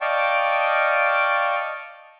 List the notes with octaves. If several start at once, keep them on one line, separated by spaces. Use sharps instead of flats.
D5 D#5 F5 G5 A5 C#6